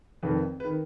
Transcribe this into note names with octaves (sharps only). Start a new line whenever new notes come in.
F1 F2 D#3 B4
B4
D#3